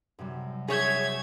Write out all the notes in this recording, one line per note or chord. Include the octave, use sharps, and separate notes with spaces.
F#2 C3 G3
G#4 C#5 E5 G#6